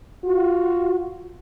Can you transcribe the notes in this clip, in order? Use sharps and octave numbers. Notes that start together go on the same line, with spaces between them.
F4 F#4